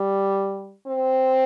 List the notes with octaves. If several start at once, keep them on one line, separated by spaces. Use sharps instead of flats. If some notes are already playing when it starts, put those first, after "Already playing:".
Already playing: G3
C4